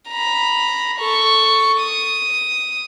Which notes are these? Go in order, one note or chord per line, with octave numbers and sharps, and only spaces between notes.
A#5 B5
A4 C#6
D#6